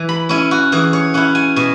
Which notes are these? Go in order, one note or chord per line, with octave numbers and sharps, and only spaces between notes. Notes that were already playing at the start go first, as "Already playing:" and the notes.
Already playing: E3 G#5
B5
C#4 E4 G#5
F#4
E3 G#4
C#5
C#4 E4 F#5
G#5
B2 G#5